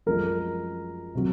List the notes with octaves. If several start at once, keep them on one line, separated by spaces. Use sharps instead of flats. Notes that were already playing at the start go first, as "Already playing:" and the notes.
F#2 F3 G#3 A#4
C3 F#3